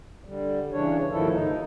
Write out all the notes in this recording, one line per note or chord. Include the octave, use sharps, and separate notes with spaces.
D3 G3
C#3 E3 D4 C#5
D#2 G#2 D#3 F3 E4 A4
D#4